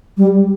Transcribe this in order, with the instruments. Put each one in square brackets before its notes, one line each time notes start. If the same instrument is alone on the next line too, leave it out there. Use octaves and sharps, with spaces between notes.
[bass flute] G3